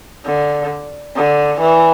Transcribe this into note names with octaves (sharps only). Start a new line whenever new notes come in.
D3
D3
E3